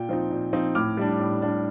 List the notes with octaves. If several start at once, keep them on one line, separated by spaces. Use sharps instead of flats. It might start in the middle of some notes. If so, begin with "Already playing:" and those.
Already playing: A#2 G5
F3 C4 D#4
A#2
F3 C4 D#4
A2 D6 F6
G3 D4
A2
G3 D4